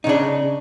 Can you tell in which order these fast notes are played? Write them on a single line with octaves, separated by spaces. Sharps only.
D#4 C#3 D4